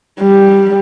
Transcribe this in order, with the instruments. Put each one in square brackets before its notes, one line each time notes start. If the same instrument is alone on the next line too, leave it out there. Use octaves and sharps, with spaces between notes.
[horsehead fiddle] G3